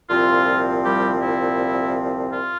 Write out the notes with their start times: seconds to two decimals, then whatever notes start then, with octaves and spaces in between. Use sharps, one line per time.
0.10 C2 A#2 F3 C4 F4
0.84 G3 G4
1.22 E4
2.33 F4